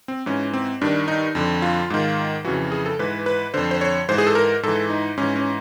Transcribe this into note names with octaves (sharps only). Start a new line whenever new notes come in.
C4
G#2 E3 C#4
C4
G2 D#3 D4
D#4
F2 D3
F4
G#2 D#3
F2 C#3 E3 F#4
G#4
A4
G#2 E3 B4
B4
F2 D3 C5
C5
C#5
G#2 E3 C5
G#4
A4
A#4
G#2 E3 A4
D#4
G#2 E3 C#4
C#4